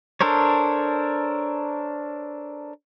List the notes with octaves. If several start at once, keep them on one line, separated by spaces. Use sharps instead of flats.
D4 A4 A#4 C5 C#5